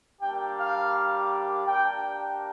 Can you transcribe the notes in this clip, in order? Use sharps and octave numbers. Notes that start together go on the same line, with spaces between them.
G3 A#3 D4 G4 G5
F5
A#3 D4 G4 G5